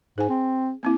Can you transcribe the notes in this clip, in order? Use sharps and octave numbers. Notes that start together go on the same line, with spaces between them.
G#2 G#4 G#5
C4
A#3 C4 E4